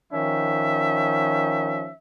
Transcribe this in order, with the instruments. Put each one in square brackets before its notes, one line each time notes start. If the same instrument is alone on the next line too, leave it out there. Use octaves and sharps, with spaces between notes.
[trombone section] D#3 F3 C#4 [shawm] E5